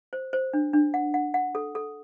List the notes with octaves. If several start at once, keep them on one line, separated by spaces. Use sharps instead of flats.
C5
C5
D4
D4
F#5
F#5
F#5
A4
A4